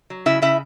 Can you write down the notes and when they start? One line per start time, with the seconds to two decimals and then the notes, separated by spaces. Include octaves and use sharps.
0.10 F#3
0.26 C#3 E4 E5
0.42 C#3 E4 E5